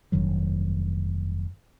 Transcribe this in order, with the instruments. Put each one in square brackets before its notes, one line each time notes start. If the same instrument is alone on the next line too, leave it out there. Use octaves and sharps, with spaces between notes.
[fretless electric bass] F1 G2 D#3 F#3